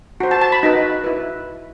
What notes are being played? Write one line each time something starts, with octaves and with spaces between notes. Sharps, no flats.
F#4 C5
A5
A5
B5
D#4 F#4 B4
E4 B4